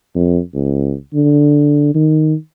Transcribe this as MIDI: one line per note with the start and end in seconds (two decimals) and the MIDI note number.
0.15 0.38 41
0.53 0.94 37
1.14 1.94 50
1.94 2.34 51